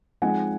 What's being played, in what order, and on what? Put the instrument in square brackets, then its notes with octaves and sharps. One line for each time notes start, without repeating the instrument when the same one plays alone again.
[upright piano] F3 G#3 C4 D#4 F#5 G#5